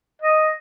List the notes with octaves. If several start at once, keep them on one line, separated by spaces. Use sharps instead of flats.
D#5